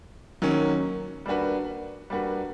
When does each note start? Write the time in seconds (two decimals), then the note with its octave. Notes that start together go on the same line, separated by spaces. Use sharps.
0.42 D#3 F#3 A#3 C#4
1.26 G3 A#3 D4 F#4 B4
2.10 G3 A#3 D4 F#4 B4